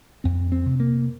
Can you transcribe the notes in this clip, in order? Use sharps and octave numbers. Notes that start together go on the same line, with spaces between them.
F2 C4
C4
C3
A#3